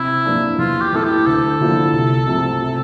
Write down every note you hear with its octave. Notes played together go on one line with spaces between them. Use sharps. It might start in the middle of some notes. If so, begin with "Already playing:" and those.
Already playing: C3 E4
E3 A#3 D4
E2 F4
G4
E3 A3 E4 A4
G4
D2 A4
D3 F3 A#3 E4
C2
C3 F3 A3
C3